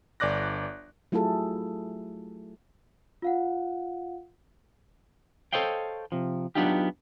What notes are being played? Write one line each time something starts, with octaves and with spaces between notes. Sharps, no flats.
G1 D5 D6 F#6 A#6
F#3 A3 E4 F4 G#4 A4
F4 F5 F#5
A4 C5 C#5 D#5 F5 G5
C3 F3
F#3 B3 D4 D#4 F4 G4